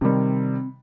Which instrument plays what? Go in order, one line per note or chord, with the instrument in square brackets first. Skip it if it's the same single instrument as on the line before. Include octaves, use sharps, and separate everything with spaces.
[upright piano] C3 D#3 G3 [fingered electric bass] C4